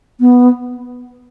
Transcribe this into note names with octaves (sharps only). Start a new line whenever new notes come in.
B3